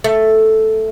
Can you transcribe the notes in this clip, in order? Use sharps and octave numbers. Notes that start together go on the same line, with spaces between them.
A3